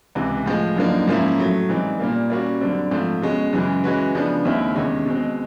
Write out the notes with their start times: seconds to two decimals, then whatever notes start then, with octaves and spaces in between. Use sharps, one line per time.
0.15 C#2 C3 E3
0.46 A2 F3 G#3
0.77 F#2 D3 F3 A#3 D#4
1.08 G#2 F3 A#3 C#4 E4
1.38 A2 F#3 A3
1.69 G#2 E3 G3 C4 D#4
2.00 A#2 G3 A#3
2.30 G3 A#3 C#4 F#4
2.61 F#2 D3 G3 C4
2.91 G#2 F3 A3 C4
3.22 B2 G#3 C#4
3.53 F#2 C#3 E3 G#3
3.84 E3 G#3 C#4 F#4 B4
4.15 C#3 F3 G#3 B3 D4
4.45 D#2 D#3 G#3 C4 E4
4.75 E2 C3 D#3 G#3 C#4
5.06 B2 G#3 C4